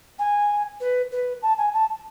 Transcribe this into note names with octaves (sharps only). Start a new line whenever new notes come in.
G#5
B4
B4
A5
G#5
A5